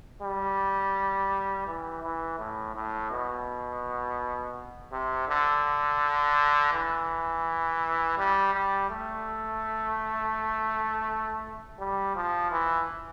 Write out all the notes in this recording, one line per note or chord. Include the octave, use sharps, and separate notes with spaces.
G3
E3
E3
A2
A2
B2
C3
D3
E3
G3
G3
A3
G3
F3
E3